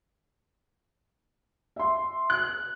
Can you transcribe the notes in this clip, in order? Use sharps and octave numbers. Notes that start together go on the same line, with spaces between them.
E5 C6
F#6